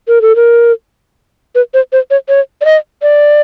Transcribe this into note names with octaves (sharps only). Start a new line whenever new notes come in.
A#4
A4
A#4
B4
C5
C5
C#5
C#5
D5
D#5
D5